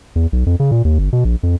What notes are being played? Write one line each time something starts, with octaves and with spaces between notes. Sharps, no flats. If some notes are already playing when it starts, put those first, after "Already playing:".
E2
B1
F2
C#3
A#2
D#2
G1
B2
A#1
F2